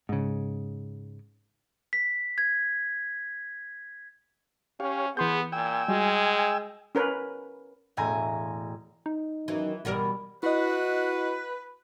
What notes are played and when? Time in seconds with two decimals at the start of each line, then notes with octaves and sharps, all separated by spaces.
0.09 G#2 C#3
1.93 B6
2.38 G#6
4.80 C#4 G4 C#5 F5
5.17 E3 B3 G#4 C6 G6
5.52 A#2 G5 G#5 E6
5.88 G3 G#3 F#4
6.95 C#4 A#4 B4
7.97 E1 A2 G#5 A#5
9.06 D#4
9.48 F#2 D#3 E3
9.85 F#1 B2 E3 G3 A#4
10.43 E4 F#4 B4 D#5